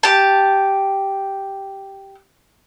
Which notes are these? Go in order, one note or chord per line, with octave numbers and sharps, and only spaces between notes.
G4 A5